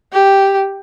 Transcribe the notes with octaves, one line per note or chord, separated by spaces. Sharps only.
G4